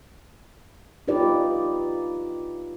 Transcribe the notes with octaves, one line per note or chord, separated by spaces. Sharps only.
D#4 F4 G4 B4 D5